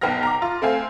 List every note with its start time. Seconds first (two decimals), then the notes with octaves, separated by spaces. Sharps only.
0.01 B1 B3 G5 F6 A#6
0.23 A#5 D6
0.42 F4
0.62 A3 C4 F5 G#5